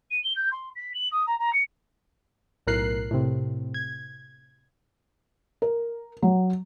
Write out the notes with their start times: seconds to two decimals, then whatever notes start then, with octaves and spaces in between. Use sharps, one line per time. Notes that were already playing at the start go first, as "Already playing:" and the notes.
0.10 D#7
0.23 G7
0.35 G6
0.51 C6
0.75 B6
0.94 F#7
1.11 D#6
1.26 A#5
1.39 A#5
1.53 C#7
2.67 B1 A2 A#4 F#6 C7
3.11 A2 C3
3.74 G#6
5.62 A#4
6.22 F#3